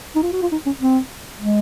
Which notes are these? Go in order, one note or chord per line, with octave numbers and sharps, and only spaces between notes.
D#4
F4
F#4
F4
D#4
C#4
C4
G#3